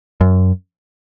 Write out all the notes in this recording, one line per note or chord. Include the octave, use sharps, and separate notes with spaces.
F#2